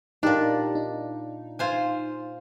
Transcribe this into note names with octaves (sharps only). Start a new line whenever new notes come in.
A#2 D4 D#4 G4 A#4
D#4
F4 C5 G#5